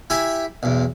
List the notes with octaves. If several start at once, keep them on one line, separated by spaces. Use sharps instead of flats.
E4 G4 E5 G#5 B5
B1 E2